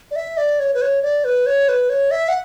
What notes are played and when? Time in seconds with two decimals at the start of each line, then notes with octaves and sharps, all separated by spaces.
0.11 D5
0.16 E5
0.37 D5
0.60 C#5
0.74 B4
0.82 C#5
1.02 D5
1.24 B4
1.46 C#5
1.68 B4
1.90 C#5
2.11 E5
2.29 F#5